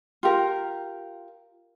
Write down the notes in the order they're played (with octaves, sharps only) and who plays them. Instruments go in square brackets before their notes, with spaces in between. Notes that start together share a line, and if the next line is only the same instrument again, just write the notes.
[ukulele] F4 G4 A#4